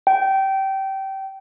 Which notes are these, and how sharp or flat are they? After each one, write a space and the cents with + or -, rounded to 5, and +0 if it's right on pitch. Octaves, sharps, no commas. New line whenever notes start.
G5 -20